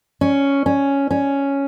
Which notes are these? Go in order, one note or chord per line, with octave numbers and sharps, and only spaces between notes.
C#4
C#4
C#4